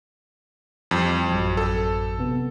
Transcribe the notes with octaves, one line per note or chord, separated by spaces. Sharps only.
F2 E3 G3
A1 F#2 F#3
A4
C3 B3